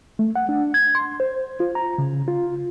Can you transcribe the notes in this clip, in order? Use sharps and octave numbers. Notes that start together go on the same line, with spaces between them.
A3
F#5
D4
G#6
C6
C5
F4
A#5
C#3
F4